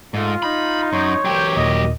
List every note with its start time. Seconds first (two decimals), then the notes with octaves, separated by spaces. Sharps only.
0.14 G#2 A3 F4
0.42 D#4 B5
0.93 F#2 C#5 C6 C#6 G6
1.25 C2 E3 F#3 G4 G5
1.57 D#2 A#2 D#4 A#4 D#5